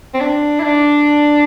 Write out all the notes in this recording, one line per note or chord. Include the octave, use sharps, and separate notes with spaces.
C4
D4
E4
D4